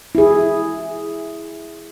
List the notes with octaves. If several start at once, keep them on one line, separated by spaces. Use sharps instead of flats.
E4 G#4